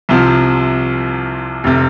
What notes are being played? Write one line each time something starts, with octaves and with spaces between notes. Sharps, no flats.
C2 C3 F3
F1 C3